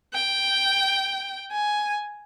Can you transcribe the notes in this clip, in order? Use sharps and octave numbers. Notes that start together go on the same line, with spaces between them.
G5
G#5